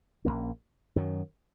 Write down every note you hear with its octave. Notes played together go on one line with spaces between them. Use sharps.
A#1 A#2 A#3 C#4
F#2 D#3 F#3